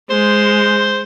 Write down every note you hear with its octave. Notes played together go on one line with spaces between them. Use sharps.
G#3 C5